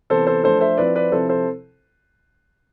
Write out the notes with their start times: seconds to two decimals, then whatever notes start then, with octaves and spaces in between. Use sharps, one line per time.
0.10 C3 E3 B3 A4 C5
0.27 A4 C5
0.44 F3 A3 D4 A4 C5
0.61 C5 E5
0.78 F3 C4 E4 B4 D5
0.95 B4 D5
1.12 C3 F3 C4 E4 A4 C5
1.29 A4 C5